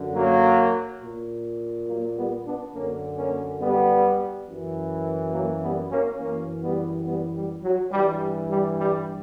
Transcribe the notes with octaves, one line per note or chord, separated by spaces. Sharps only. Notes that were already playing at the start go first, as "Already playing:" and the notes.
Already playing: F#2 D3
F#3 A#3
A#2
F#3 A#3
G3 B3
B3 D4
F#2 D3 A#3 C#4
A#3 C#4
G3 B3
F#2 E3
F#3 A#3
G3 B3
A#3 C#4
F#2 E3 A#3 C#4
G3 B3
G3 B3
G3
F#3
G2 E3 G3
G3
G3